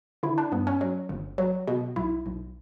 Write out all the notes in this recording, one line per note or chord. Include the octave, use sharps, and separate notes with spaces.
D3 E4
D4
G2 B3
C#4
F#3
G1
F#3
B2
B1 E4
B1